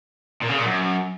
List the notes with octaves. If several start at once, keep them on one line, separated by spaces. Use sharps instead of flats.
A#2
C#3
A#2
F#2